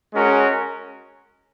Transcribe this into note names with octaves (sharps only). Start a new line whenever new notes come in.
G#3 C#4 F#4 A#4